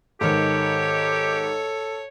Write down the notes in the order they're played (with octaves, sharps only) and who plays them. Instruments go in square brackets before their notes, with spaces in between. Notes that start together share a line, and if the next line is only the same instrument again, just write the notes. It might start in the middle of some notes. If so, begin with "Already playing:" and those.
[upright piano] G#2 D#3 [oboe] G4 [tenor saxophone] A4 [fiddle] C#5